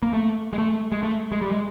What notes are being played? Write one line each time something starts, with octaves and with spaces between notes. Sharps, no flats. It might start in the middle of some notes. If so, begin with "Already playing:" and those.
A#3
A3
G#3
A3
G#3
A3
G#3
G3
G#3